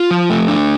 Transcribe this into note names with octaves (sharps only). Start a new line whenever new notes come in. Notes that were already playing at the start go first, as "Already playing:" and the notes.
Already playing: F4
F3
A3
D4